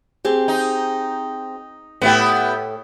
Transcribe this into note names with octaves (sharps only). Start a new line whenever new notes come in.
C4 G4 G#4
D#4
A2 B3 E4 G4 G5